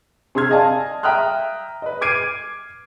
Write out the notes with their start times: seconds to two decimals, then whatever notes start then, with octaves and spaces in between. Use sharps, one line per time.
0.35 C3 G#4 C6 E6 F6 G#6
0.50 D5 D#5 F5 G#5 A5
1.03 E5 G5 A#5 D#6 F6 F#6
1.82 B4 D#5
2.01 D6 F6 G#6 C7 D7 D#7